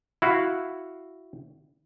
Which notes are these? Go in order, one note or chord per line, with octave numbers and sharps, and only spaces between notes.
E4 F#4 F5